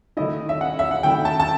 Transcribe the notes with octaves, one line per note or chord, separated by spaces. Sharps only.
D#3 A3 E4 D#5
E5
F#5
E5
F#5
D#3 A3 E4 G5
A5
A5